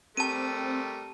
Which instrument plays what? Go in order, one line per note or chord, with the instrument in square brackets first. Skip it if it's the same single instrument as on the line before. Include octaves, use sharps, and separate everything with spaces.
[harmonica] G3 A3 A#4 [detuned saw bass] C4 [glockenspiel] A5 D#7